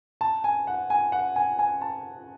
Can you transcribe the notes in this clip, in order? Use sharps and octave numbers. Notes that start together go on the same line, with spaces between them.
A5
G#5
F#5
G#5
F#5
G#5
G#5
A5